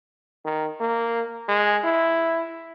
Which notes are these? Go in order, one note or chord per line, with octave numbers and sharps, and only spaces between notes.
D#3
A#3
G#3
E4